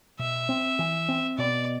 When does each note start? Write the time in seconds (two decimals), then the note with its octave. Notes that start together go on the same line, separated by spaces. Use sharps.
0.19 B2 E5
0.49 C4
0.79 E3
1.09 C4
1.38 B2 D5